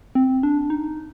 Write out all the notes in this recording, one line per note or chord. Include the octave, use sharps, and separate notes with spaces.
C4
D4
D#4